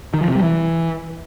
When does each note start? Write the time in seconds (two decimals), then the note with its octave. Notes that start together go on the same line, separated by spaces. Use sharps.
0.14 D#3
0.21 F3
0.28 C3
0.35 G3
0.43 E3